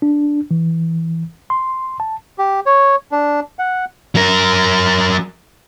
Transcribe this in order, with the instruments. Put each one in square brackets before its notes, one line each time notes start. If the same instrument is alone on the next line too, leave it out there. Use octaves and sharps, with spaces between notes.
[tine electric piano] D4
E3
C6
A5
[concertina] G4
C#5
D4
F#5
[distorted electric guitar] F#3 A#4